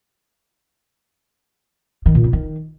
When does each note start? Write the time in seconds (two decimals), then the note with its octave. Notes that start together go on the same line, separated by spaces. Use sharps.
2.06 D#3
2.15 A#2
2.24 C#3
2.33 D#3